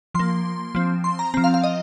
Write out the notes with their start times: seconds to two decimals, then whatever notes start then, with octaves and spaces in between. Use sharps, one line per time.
0.14 F3 A#3 C6
0.75 F3 C4
1.04 C6
1.19 A#5
1.34 F3 C4 A#5
1.44 F5
1.54 F5
1.64 D#5